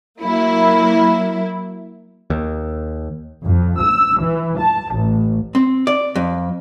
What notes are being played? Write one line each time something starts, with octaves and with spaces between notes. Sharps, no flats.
F#3 A#3 E4
D#2
F2
E6
E3
A5
A1
C4
D5
F2